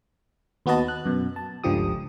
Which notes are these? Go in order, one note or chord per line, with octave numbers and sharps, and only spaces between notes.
D#2 B3 F#4 B4 D#5 A5
F#6
F#2 B2
A5
G1 C#2 D3 F3 G4 D#6